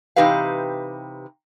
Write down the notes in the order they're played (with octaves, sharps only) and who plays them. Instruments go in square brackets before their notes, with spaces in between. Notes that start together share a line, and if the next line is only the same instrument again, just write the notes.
[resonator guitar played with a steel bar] C3 E3 D#4 G4 B4 F5